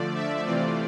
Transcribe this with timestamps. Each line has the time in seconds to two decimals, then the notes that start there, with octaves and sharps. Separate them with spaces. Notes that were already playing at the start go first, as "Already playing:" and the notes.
Already playing: D3 F3 A3 D5
0.14 E5
0.45 C3 E3 A3 C4 F4 D5